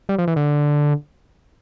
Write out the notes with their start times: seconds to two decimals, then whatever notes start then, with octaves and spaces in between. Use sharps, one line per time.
0.09 G3
0.18 F3
0.27 E3
0.36 D3